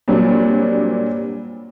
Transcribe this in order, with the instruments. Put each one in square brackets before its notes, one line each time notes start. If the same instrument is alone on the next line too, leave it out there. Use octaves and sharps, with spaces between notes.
[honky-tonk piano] A#2 F#3 G3 C4 D4